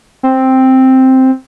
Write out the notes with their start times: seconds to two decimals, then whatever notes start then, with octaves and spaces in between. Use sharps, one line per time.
0.23 C4